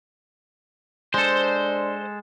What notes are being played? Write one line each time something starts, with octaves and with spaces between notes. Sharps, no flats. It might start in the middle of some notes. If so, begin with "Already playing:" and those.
G#3 D4 A4 C5